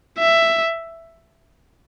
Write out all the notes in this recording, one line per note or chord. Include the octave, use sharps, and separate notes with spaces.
E5